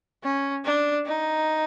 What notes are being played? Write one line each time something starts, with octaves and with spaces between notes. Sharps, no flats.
C#4
D4
D#4